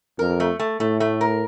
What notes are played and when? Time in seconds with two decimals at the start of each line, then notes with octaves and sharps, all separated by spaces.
0.19 F2 A#4
0.40 A3
0.59 A3
0.80 A2 A3
1.00 A3
1.21 A#4